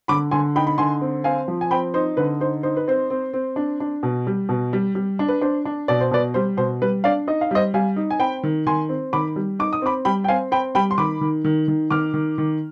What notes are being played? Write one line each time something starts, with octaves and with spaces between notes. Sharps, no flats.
D3 B5 D6
D3 G#5 C6
D#4 G5 B5
B5
D3 G#5 C6
C4
C4 F5 G#5
F3
G#5
C4 G5 B5
D#4 C5
D3 B4
D#4 C5
D#4 C5
B4
C4 C5
C4
C4
D4
D4
B2
G3
B2
G3
G3
D4
B4
D4 C5
D4
B2 D5
C5
B2 B4 D5
G3 C5
B2 C5
G3 B4
D4 D5 F5
D#4 D#5
F5
G3 C5 D#5
G3 F5 G#5
D#4
G#5
C4 G5 B5
D#3
D#3 G#5 C6
C4
D#3 B5 D6
G3
D#4 D6
D#6
C4 B5 D6
G3 G5 B5
G5
C4 F5 G#5
C4 G5 B5
G3 G5 B5
C6
D#3 B5 D6
D#3
D#3
D#3
D#3 D6 F6
D#3
D#3